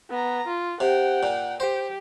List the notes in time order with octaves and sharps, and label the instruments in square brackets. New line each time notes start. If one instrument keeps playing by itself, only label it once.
[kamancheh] B3 A#5
F4
[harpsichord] C3 [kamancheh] F#5 G5
[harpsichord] A#2
[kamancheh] G4 [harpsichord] C5